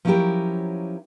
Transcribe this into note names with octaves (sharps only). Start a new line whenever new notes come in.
F3 F#3 C#4 E4 G4 A#4